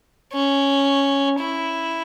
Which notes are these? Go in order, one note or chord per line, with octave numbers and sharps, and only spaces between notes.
C#4
E4